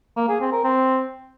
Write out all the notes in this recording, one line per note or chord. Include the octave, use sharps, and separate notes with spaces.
A#3
G#4
C4
A#4
C4